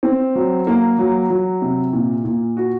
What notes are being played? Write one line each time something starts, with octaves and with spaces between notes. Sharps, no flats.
C4
F#3
A#3
F#3
F#3
C3
A#2
A#2
F#4